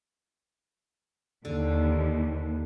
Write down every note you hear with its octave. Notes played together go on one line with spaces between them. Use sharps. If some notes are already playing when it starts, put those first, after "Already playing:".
D#2 D3